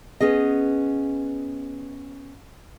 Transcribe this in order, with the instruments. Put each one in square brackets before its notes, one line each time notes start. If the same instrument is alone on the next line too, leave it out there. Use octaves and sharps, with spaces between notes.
[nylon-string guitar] B3 C#4 G#4 D#5